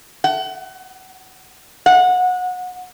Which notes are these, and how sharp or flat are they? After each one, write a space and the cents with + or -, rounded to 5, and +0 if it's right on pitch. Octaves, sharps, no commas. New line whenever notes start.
F#5 +35
F#5 -25